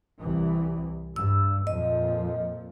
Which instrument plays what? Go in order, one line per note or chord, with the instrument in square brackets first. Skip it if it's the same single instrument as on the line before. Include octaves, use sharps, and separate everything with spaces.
[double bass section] C2 E3
[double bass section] G2 [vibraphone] E6
[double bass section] F2 A#2 F3 [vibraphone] D#5